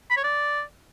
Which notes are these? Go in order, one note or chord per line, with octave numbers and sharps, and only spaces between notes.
B5
C#5
D5